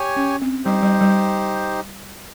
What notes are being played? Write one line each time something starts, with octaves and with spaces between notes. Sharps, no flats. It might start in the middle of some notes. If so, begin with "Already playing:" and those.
Already playing: G4 C#5 G#5
C#4
C4
G3 D#4 G4 C5
G3
G3